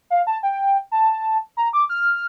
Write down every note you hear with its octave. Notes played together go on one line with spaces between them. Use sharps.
F5
A5
G5
A5
A#5
D6
F6